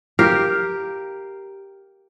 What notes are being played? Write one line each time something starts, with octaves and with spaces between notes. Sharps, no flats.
G4 A#4 F5